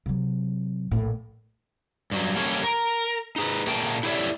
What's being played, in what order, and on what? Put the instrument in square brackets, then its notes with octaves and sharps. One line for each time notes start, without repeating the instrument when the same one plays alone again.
[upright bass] C3 F#3
A#1 A2
[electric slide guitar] G2 F#3
G3 A#3 C#4 A4 C#5
A#4
D#4 G#4 B4
A#2 A3 G#4 A#4 G5 A5
E4 G4 A4 C#5 D5 E5